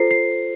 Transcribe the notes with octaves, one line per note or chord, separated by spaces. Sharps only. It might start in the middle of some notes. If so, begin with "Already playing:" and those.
Already playing: F4 A4 C5 C7
C7